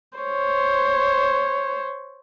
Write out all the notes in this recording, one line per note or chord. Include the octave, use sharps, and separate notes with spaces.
C5 C#5